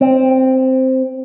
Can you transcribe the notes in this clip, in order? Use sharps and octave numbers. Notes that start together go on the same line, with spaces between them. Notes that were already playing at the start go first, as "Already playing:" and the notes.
C4